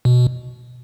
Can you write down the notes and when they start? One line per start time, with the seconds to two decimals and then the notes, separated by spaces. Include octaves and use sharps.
0.05 B2